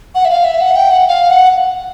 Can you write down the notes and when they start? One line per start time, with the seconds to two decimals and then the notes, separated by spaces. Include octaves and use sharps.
0.15 F#5
0.25 E5
0.30 F5
0.45 E5
0.61 F#5
0.76 G5
0.91 F#5
1.08 F5
1.30 F#5